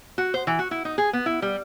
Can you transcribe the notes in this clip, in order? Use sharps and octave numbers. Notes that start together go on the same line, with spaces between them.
F#4
C5
E3
F#4
E4
D#4
G#4
B3
E4
G3